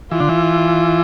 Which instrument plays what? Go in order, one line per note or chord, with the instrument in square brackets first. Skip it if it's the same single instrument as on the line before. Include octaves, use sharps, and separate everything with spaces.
[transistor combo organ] E3 [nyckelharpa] F4
[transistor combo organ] D3
E3